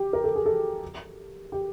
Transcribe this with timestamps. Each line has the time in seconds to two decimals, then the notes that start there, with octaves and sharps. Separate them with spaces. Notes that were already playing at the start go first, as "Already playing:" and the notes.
Already playing: G4
0.13 A#4
0.24 A4
0.35 G#4
0.46 A4
1.52 G4